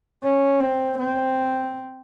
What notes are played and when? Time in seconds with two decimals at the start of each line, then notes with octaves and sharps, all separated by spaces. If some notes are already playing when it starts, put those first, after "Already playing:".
0.24 C#4
0.60 C4
0.98 C4